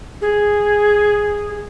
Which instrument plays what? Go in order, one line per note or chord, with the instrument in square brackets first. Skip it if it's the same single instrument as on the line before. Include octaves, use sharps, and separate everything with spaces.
[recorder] G#4